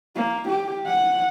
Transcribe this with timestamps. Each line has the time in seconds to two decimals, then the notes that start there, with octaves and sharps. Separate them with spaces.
0.16 A#3
0.48 G4
0.87 F#5